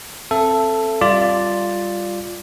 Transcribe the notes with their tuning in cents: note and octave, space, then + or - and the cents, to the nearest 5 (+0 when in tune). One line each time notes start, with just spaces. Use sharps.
C4 +20 A4 +0 E5 +30
G3 +0 F4 +0 D5 +0